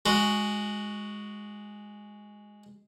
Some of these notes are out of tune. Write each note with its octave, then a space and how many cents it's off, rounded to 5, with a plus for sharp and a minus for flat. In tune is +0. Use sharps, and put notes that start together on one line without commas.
G#3 +0 F#4 +0